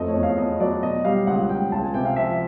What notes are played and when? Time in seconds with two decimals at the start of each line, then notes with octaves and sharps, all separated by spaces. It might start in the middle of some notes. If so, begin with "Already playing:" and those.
Already playing: F2 A3 D#5
0.08 C#5
0.15 E2
0.23 F5
0.38 E2 D#5
0.60 F#3 D5
0.83 B2 D#5
1.05 G3 F5
1.27 C#2 F#5
1.49 C#2 G5
1.72 C#2 A5
1.83 G#5
1.94 C3 G5
2.05 F5
2.16 F3 E5